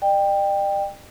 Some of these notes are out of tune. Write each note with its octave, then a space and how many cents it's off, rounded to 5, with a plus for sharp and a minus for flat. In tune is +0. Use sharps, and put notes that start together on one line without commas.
D5 +45 G5 +10